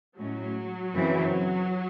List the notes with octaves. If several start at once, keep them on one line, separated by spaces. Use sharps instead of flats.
A2 F#3 G#3 C#4
F#2 C#3 E3 C4